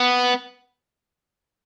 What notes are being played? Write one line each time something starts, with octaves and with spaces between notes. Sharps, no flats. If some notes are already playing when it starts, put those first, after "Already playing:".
Already playing: B3